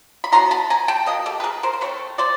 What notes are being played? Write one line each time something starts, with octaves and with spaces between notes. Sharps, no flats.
B5
F#3 B3 E4 A#5 C6
A5 B5
G#5 A#5
G5 A5
F#3 A#3 D#5
B2
G4 A4
B4
G#4 A#4
A#4 C5
C5
E3 A3 C4 B4 C#5
C5 D5